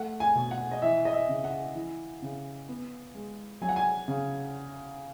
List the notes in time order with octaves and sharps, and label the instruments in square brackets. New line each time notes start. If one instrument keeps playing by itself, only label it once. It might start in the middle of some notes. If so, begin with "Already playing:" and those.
Already playing: [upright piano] A3 F#5
G#5
B2
F#5
D#5
E3 E5
D#5
E5
C#3
F#5
E3
C#3
B3
G#3
F#3 G#5
F#5
G#5
C#3